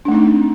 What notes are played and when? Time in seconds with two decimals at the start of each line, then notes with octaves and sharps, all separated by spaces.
0.05 D4
0.08 A3
0.11 D#4
0.15 C4